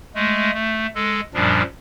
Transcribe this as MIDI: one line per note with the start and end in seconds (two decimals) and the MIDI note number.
0.15 0.51 56
0.15 0.51 57
0.54 0.87 57
0.95 1.21 56
0.95 1.21 69
1.34 1.62 42
1.34 1.62 46
1.34 1.62 53
1.34 1.62 55
1.34 1.62 62